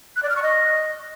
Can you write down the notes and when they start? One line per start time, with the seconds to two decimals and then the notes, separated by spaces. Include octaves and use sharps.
0.16 F#6
0.23 D5
0.29 F6
0.36 C#6
0.42 D#5